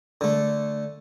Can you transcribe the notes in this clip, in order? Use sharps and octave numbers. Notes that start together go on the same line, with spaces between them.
D3 A3